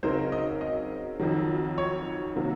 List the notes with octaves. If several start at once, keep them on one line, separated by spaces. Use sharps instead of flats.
C#3 F#3 C4 D#4 A#4 C5
D#5
D#5
F2 D#3 F#3
C#5
C3 D#3 F#3 A#3